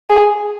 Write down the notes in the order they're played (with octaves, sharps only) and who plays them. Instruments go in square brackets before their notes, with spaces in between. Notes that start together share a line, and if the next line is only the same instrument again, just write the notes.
[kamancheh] G#4